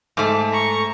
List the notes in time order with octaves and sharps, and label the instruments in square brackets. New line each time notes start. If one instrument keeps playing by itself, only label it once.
[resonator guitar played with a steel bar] G#2 A3
[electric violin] A#5 C#6